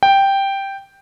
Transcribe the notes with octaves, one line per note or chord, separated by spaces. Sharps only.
G5